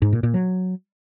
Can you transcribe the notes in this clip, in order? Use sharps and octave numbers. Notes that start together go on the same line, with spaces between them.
G#2
A#2
A#2
F#3